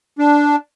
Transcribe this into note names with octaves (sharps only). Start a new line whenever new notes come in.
D4